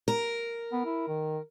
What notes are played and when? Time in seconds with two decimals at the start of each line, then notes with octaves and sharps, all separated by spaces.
0.08 A#4
0.73 B3
0.86 E4
1.08 D#3